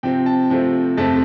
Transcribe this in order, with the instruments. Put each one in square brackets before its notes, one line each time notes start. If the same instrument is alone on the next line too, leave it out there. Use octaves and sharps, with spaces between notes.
[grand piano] C3 F3 C4 G5
A5
C3 F3 A3 C4
F2 C3 A3 C4 A5